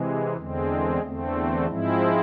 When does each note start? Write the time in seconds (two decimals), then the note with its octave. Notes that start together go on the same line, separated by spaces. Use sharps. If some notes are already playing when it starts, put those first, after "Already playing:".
Already playing: C3 E3 G#3
0.37 E2 D3 G#3 C4
1.03 E2 D3 A3 C4
1.67 G#2 F3 G#3 C4 E4